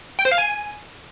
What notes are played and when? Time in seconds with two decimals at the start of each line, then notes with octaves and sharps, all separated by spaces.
0.19 G5
0.25 C5
0.32 F5
0.38 G#5